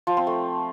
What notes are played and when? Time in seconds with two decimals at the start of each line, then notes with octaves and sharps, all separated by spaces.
0.07 F3
0.17 C4
0.27 A3